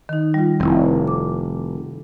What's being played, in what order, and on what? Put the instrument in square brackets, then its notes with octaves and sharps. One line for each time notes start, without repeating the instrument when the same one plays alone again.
[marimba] D#3 D#4
G3 F4
[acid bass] F1 [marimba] C4 E4
[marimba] D6